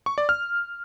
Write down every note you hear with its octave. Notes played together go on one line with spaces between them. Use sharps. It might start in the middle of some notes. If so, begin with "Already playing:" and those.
C#6
D5
F6